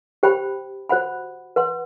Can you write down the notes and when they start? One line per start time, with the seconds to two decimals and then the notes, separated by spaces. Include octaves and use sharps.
0.23 G4 C5 G5 B5
0.89 F#4 C5 F#5 B5
1.56 B4 F#5 C6